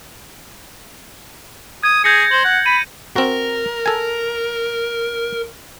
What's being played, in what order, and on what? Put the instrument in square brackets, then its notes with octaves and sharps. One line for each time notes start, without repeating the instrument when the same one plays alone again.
[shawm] D#6 [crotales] G#6
[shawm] G#4 [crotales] G6 A#6 C#7
[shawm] C5 [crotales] F#7
[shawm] F#5
[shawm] B5 [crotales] D#7
[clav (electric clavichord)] C4 F#4 [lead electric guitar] A#4
[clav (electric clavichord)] A4 G#5